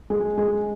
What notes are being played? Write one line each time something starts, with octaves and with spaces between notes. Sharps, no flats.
G#3
G#3